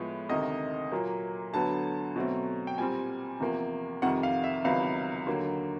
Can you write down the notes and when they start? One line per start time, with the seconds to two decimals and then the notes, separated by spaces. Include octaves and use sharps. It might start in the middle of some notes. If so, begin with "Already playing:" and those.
Already playing: A2 F3 G#3 B3
0.29 D2 C3 D#3 D#5
0.92 A#2 F#3 A#3
1.53 D2 D3 F#3 B3 A5
2.16 B2 F#3 A3 C4
2.67 G5
2.78 A#2 G3 C4 G#5
3.40 E2 C3 F3 A#3
4.02 F2 C3 D#3 G3 F#5
4.23 F5
4.44 E5
4.64 C#2 C3 D#3 F#3 B3 F5
5.27 D#2 D3 F#3 A#3